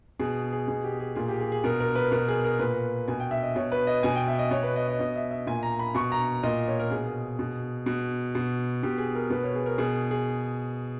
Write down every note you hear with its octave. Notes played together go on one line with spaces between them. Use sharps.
B2 G#4
G#4
B2 G#4
G4
G#4
A#2 G#4
G4
G#4
G#4
B2 A#4
A#4
B4
B2 A#4
G#4
A#4
A#2 B4
B2 G#5
G5
E5
D#5
B2 C#5
B4
D#5
B2 G#5
G5
E5
D#5
B2 C#5
B4
D#5
D#5
B2 D#5
E5
E5
A#2 G#5
A#5
B5
B2 C#6
A#5
A#2 D#5
C#5
A#4
B2 G#4
B2
B2
B2
B2 G4
G#4
A#4
B2 B4
C#5
G#4
A#4
B2 G#4
G#4